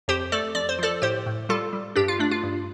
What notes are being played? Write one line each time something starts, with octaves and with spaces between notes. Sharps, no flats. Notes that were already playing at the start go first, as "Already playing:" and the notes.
F2 G4 C5
A3 A4 D5
F2 D5
C5
F3 A4 D5
A2 G4 C5
A2
G3 F4 A4
G3
G2 D4 G4
F4
A3 D4
F4
G2